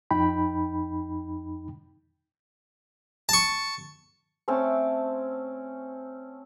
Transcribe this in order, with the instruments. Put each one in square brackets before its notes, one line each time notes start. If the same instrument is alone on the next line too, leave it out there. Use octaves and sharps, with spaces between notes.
[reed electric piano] F2 D#4 G5 B5
[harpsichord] A5 C#6
[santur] A3 C4 C#4 A5